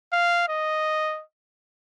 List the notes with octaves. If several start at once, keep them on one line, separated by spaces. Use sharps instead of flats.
F5
D#5